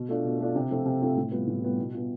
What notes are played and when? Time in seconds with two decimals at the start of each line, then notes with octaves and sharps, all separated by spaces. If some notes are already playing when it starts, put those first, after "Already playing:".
Already playing: B2
0.09 A3 D4 F4
0.24 B2
0.40 A3 D4 F4
0.55 C3
0.71 F3 A3 C4 F4
0.86 C3
1.01 F3 A3 C4 F4
1.17 A2
1.31 G3 B3 F4
1.47 A2
1.62 G3 B3 F4
1.78 B2
1.93 B3 F4